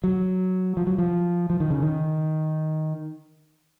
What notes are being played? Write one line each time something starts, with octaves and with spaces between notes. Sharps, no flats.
F#3
F3
F#3
F3
F3
D#3
C#3
D#3